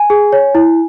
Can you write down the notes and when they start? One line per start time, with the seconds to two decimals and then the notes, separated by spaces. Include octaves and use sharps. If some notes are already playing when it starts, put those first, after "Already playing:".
Already playing: G#5
0.10 G#4
0.33 C#5
0.55 E4